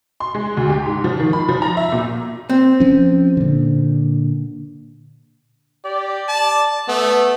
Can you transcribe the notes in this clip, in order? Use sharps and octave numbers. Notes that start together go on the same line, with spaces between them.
C6
G#3
D2
G4
G#2
F3
D#3
B5
F3
A#5
E5
A#2
C4
F3 C#4
A#2 D3
G4 D5
A5
A3 B3